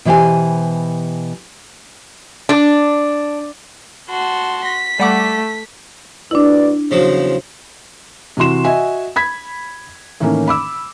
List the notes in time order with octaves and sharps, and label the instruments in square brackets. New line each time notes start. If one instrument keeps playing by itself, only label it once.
[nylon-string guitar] B2 E3 E4 G4 C5 G#5
[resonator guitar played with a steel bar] D4
[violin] F#4 A5 [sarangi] C6
[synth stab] A#6 [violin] B6
[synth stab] G3 F#5 D6 [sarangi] A3
[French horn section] D2 B4 D5 [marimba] D4 E4
[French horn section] E2 C5 [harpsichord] C#3 F3 F#3
[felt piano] C3 E3 F#4 C6 E7
F#4 D#5 E5 G#5
B5 G#6 B6
A2 D#3 E3 A#3 C#4
B5 D6 E6